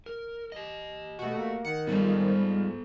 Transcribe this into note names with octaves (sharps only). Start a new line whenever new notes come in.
A#4
G4 D#5
B2 A3 F#4
A#3
D#3 F#5
G#2 F3 G3 B3 A4